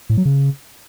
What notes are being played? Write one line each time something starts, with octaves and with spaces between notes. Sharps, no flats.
A2
F#3
C#3